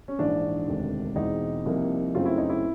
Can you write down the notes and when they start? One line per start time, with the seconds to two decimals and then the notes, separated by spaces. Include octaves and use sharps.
0.08 C#4
0.19 A#1 G#2 E3 D4
0.67 E1 D2 C3 D#3
1.16 E2 B2 G#3 C4 D#4
1.66 C2 C3 F3 A#3
2.14 F#2 C#3 F#3 A3 C4 F4
2.25 E4
2.38 D#4
2.49 E4